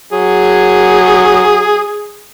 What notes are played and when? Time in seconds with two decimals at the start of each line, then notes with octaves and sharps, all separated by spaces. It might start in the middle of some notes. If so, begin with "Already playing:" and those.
0.13 F#3 G#4